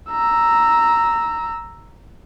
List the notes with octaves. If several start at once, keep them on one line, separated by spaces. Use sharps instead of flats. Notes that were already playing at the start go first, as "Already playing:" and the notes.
A#5 E6